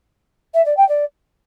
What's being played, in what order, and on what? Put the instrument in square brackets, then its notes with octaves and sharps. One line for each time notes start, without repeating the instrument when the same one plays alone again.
[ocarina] E5
D5
G5
D5